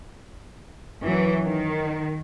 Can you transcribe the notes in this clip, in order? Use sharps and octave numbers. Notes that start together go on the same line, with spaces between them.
F#2 E3 F#3
D#3